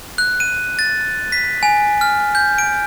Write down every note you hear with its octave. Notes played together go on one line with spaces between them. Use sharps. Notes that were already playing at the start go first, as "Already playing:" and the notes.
F#6
D#7
A6
B6
G#5
F6
G6
D7